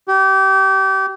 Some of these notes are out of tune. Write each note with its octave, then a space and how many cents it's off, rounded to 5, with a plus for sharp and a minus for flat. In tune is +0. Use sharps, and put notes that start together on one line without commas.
G4 -30